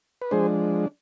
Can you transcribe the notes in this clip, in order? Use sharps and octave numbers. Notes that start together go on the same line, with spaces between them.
B4
F3 G#3 D4 G#4 C5